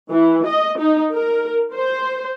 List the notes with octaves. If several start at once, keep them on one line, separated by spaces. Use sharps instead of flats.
E3
D#5
D#4
A#4
C5